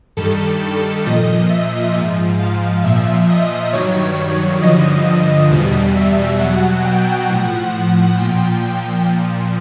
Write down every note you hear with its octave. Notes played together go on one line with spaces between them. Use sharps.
G2 D#3 G3 A4
A#2 F3 D#5
E5
G#2 F3
F5
A#2 F3 E5
D#5
G2 D#3 F#3 C#5
G2 D3 F3 D#5
E2 B2 G3
E5
B2 F#3 F#5
G5
A2 F3 F#5
F#5
A#2 F3 G5
A#2 F3